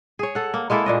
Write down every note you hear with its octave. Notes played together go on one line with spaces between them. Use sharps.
G#4 C#5
A4 F#5
A#3
G#3 A#3 E4 A4
A#2 D4 D#5